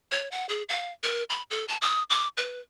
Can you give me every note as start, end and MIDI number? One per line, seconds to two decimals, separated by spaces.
0.12 0.28 73
0.32 0.46 78
0.49 0.63 68
0.69 0.92 77
1.03 1.24 70
1.30 1.42 83
1.51 1.65 69
1.68 1.77 81
1.82 2.03 87
2.10 2.28 86
2.37 2.61 71